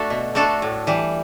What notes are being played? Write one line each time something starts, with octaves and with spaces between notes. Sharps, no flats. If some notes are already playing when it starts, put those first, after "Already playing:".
Already playing: A3 D4 F#4 A4
B2
A3 D4 F#4 A4
A2
E3 G3